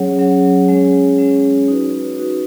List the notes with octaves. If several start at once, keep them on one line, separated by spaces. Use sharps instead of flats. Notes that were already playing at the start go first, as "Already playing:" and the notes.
Already playing: F#3 C#4 G#4 C#5 F#5
F#3 C#4 G#4 C#5 F#5
G#3 C#4 G#4 C#5
G#3 C#4 G#4 C#5
D#4 F#4 B4
D#4 F#4 B4